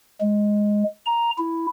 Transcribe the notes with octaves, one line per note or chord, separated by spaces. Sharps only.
G#3
A#5
E4